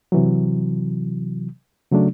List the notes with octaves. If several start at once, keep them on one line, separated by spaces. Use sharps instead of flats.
C3 E3 F#3
C#3 F#3 A3 D4